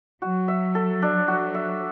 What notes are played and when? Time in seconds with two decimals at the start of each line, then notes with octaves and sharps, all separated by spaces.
0.22 F#3 F#4
0.48 E5
0.75 A4
1.02 D4
1.28 F#4
1.54 E5